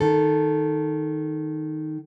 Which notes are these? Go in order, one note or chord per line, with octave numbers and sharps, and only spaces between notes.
D#3 A4